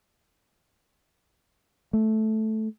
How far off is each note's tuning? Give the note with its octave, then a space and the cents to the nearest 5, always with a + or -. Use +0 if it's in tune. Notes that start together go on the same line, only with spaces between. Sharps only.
A3 -10